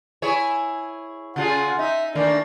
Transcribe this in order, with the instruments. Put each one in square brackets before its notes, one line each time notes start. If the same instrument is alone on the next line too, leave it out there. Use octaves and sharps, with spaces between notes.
[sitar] E4 G#4 C#5
[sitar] C#3 F4 G#4 [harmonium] F#5
[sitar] D#4 [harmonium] E5
[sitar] D#3 A3 A#3 [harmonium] D4 D5